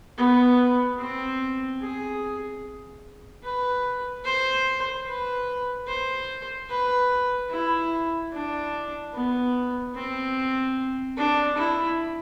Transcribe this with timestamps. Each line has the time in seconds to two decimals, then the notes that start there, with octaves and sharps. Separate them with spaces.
0.18 B3
0.99 C4
1.81 G#4
3.44 B4
4.25 C5
5.06 B4
5.87 C5
6.70 B4
7.51 E4
8.33 D4
9.14 B3
9.95 C4
11.17 D4
11.58 E4